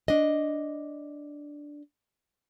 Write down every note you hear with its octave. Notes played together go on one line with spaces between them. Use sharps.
D4 D#5